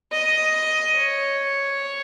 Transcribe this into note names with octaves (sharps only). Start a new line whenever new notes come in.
D#5
C#5